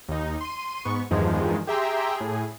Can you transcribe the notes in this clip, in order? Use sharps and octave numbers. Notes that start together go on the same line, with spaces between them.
D#2 D#4
C6 D#7
G#2 B3 C#6
E2 G2 D#3 F3 G#3
G4 G#4 E5 G5 A#5 C6
A2 G#4